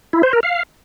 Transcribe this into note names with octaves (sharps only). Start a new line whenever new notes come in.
E4
C5
A#4
F5